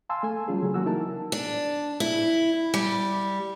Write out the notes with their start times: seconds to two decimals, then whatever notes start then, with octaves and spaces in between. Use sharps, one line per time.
0.09 F5 G#5 A5 C6 E6
0.23 A3 A4 G#5
0.48 F#3 G3 C#4 F4 G#4
0.62 C#3 F#3 A3
0.74 E3 F#3 A#3 F#4 E6
0.86 D#4 E4 A#4 A5
1.32 D4
2.00 E4
2.74 G3